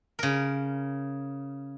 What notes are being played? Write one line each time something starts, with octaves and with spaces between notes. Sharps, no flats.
C#3 A#4